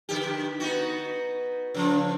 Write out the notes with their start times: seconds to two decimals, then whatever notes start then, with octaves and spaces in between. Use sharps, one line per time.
0.09 D3 G4
0.60 B3 D#4 F#4
1.74 C#3 F3